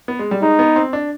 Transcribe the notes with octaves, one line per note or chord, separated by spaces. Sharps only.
B3
G#3
G3
G#3 D#4
B3
C4
D4